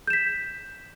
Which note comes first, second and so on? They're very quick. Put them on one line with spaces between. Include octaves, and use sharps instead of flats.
G6 E7 B6